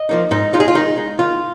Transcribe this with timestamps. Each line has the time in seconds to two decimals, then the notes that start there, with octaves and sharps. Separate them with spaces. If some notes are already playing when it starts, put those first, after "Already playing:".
Already playing: D#5
0.09 F3 A#3 D#4
0.31 G#2 D#4
0.53 G#3 D#4 F4
0.60 G#4
0.68 F4
0.75 D#3 D#4
0.97 G#3 D#4
1.19 D#3 F4